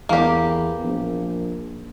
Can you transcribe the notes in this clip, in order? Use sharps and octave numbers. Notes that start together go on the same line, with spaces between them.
E2 A#3 G4
A#1